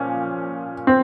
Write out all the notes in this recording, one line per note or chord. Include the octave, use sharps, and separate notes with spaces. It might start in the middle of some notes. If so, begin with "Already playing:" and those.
Already playing: A#2 F3 C#4
C4